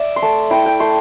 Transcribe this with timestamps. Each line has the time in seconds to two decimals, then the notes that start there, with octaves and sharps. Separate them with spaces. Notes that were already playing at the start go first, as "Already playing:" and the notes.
Already playing: D5 E5
0.16 C6
0.22 A3 A5
0.51 E4 G5
0.66 G5
0.80 A3 C6